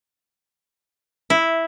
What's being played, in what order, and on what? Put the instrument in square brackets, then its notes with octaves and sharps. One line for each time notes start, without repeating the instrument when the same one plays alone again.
[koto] E4